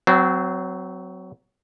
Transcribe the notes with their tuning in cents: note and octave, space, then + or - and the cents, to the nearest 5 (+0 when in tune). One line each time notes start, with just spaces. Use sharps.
F#3 +10 C4 -25